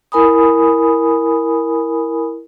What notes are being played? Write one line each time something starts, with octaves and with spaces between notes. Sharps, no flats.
E4 A#4 G#5 B5 D#6